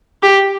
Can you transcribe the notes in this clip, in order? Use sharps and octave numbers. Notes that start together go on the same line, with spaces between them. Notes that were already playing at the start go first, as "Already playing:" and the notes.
G4